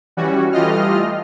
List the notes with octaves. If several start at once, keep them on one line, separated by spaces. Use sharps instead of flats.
E3 G3 C#4 F#4
E3 G3 A3 F4 D#5 F6